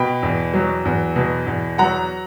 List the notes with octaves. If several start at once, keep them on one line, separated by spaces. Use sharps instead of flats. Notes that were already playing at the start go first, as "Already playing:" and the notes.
Already playing: B2 G5 B5
E2
F#3
E2
B2
E2
F#3 F#5 A#5